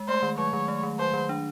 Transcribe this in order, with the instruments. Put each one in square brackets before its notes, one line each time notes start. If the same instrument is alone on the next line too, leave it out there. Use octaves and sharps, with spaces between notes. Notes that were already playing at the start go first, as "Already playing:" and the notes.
Already playing: [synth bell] G#3
[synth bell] A3 [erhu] C5
[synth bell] D#3
[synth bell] F#3 [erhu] C#5
[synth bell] D#3
A3
D#3
[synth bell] F#3 [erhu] C5
[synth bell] D#3
D4